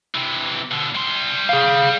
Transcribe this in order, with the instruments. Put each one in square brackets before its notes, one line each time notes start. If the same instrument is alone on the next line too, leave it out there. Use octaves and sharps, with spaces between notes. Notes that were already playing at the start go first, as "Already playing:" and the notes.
[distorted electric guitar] C3 E3
B2 D3
G3 C6
[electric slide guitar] G#4 F5